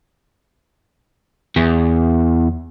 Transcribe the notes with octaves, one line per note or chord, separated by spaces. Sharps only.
E2